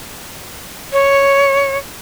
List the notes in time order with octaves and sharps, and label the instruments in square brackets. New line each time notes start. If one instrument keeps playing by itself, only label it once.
[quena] C#5